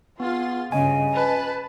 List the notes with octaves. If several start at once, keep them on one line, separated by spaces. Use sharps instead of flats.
B3 F4 G#4 C6
G2 C#3 D#5 G#5
B4 A5